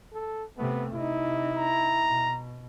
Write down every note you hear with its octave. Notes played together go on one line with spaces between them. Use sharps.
A4
C3 A3 B3
C3 D#4 E4
A#5
B2